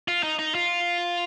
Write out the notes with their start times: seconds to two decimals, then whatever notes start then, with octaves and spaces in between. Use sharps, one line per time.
0.08 F4
0.23 D#4
0.39 D#4
0.55 F4